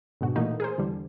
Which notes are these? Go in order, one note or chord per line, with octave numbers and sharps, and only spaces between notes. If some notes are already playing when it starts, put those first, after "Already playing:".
G#2 B2 D3 F#4
A#2 E3 A3 A#3 D#4 F#4
G#4 A#4 C5
E2 D3 G3